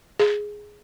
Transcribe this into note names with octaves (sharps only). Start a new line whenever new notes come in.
G#4